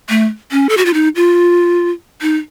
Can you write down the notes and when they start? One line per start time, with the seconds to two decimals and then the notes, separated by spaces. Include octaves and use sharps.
0.09 A3
0.52 C#4
0.69 A4
0.77 F#4
0.85 F4
0.94 D#4
1.16 F4
2.22 D#4